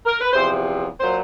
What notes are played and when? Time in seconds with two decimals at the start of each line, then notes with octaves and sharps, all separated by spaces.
0.06 A#4
0.21 B4
0.33 E2 C3 F3 C5
1.00 A#2 F#3 C5